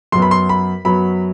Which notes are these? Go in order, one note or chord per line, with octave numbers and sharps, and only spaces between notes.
F#2 F#3 B3 C6
B5
C6
B5
F#2 F#3 B3 B5